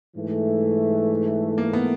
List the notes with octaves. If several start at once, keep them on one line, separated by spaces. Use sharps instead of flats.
G#2 E3 A3
A#3
B3